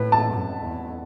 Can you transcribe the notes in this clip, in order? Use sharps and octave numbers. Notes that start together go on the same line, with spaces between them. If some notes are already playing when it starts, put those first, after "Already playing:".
Already playing: A2 B4
A5
F#2
E2